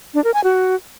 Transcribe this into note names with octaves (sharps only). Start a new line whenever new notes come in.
D4
A#4
G#5
F#4